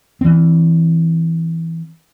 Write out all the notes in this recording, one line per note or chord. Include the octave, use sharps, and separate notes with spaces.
E3 C4